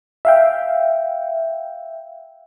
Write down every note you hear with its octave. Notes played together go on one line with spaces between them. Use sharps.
E5 F5 G5